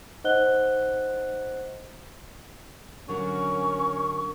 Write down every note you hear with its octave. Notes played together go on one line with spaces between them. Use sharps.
D#4 C5 D#5 F#5 F#6 G7
D3 F#3 C#4 A#4 C#6